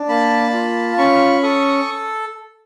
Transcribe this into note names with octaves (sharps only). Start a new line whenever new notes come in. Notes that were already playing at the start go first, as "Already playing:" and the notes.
Already playing: D4
A#3 A5 B5
F4
C#4 B5 C#6
A4 C#6 D#6